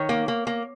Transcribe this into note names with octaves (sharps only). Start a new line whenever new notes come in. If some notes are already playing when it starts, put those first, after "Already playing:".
Already playing: D#3 C#5
A#3
A#3
A#3